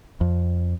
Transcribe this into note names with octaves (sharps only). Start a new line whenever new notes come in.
F2